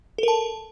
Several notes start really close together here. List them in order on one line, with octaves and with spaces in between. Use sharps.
A4 A#4 A5